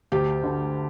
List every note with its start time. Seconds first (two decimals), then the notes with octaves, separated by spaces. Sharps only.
0.12 D2 G4
0.43 D3